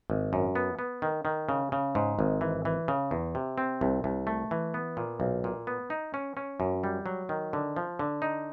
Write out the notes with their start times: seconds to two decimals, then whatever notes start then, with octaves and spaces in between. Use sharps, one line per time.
0.10 G#1
0.33 F#2
0.56 B3
0.79 B3
1.02 D#3
1.25 D#3
1.49 C#3
1.72 C#3
1.95 G#2
2.19 G#1
2.41 E3
2.65 E3
2.88 C#3
3.11 E2
3.35 C3
3.58 C4
3.81 C2
4.04 C2
4.27 A3
4.51 E3
4.74 B3
4.97 A#2
5.20 B1
5.44 A#2
5.67 B3
5.90 D#4
6.14 C#4
6.37 C#4
6.60 F#2
6.84 G3
7.06 F#3
7.29 D#3
7.53 D3
7.76 F3
7.99 D3
8.22 D#4